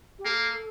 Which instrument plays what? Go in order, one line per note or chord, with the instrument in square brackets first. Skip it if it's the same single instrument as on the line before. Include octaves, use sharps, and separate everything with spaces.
[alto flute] G4
[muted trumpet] A#3 [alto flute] A4